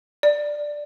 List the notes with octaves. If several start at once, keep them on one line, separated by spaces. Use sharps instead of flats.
D5